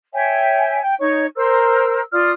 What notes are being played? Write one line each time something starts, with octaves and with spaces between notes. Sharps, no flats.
C#5 E5 G5 G#5
G5
D#4 C#5 C#6
A#4 C5 E6
F4 D5 D#6 F6